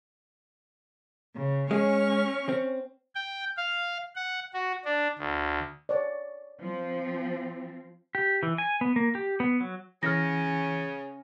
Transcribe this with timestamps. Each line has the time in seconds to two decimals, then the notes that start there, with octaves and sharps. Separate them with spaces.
1.36 C#3
1.71 G#3 C#4 G#4 C#6 F6
2.49 C4
3.15 G5
3.57 F5
4.15 F#5
4.54 F#4
4.85 D4
5.19 D2
5.89 C#5 D5
6.60 F3 C4
8.15 G4
8.43 E3
8.58 G#5
8.81 B3
8.96 A#3
9.15 G4
9.40 B3
9.60 F#3
10.03 C#3 E3 C#4 F6 A#6